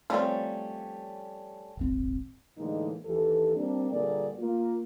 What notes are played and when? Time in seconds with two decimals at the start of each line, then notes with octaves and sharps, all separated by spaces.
0.10 F3 G3 A3 C4 C#4
1.77 D#1 G#1 C4
2.58 A2 D3 E3 G#3 A#3 D#4
3.05 D#2 E3 G4 A4
3.55 G3 A#3 C4 D4
3.92 G2 A#2 D3 G#4 A#4 D5
4.39 A#3 F4